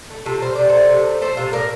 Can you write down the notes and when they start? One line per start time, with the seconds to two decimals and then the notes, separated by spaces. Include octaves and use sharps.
0.10 A3
0.26 C3 F4 A4
0.42 G3 C5
0.55 C3 D5
0.69 C3 A4 C5
0.90 C3
1.05 A3
1.21 A3 A4 C5
1.37 C3 F4 A4
1.53 A2 A#4 D5